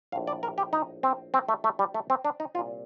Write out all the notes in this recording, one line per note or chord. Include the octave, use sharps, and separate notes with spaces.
A#1 A2 F5
D5
A#4
G4
D#4
C4
C4
A3
A3
G3
A3
C4
D4
D#4
C2 A#2 F4